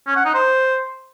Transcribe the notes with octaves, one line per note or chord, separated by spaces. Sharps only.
C#4
F#5
D#4
C5